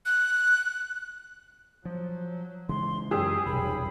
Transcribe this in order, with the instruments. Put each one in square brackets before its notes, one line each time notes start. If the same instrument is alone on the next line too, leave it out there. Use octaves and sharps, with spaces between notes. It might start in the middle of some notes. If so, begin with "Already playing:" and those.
[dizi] F#6
[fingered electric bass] F3 [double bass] F#3
[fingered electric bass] C#3 E3 G#3 [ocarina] C6
[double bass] F#2 [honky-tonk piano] G4 G#4 E6 [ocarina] D#6
[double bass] F1 B1 [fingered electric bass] E2 G3 [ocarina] B5